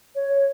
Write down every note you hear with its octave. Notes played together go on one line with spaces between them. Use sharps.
C#5